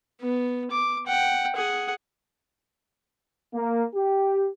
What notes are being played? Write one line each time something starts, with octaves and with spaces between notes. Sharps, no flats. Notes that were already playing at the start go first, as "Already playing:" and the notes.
B3
D6
F#5 G5
G#4 F#5
A#3
G4